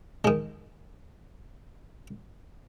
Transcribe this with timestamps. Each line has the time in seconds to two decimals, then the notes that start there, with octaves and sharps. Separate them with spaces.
0.25 D#3 G#3